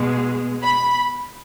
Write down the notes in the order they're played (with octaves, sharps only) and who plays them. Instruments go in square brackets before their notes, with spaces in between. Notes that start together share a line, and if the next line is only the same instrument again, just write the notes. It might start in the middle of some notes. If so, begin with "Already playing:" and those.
Already playing: [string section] B2 G#3
B5